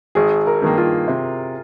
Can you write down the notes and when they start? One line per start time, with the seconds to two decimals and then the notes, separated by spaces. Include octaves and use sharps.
0.15 G#1 G#4
0.47 A#4
0.62 G2 D#3 A#3
0.77 F4
1.08 C3